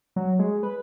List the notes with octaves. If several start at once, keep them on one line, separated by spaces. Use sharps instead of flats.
F#3
G#3
B4